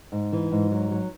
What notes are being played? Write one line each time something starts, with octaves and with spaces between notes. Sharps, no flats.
G#2
E3
G#2
F#3
F#3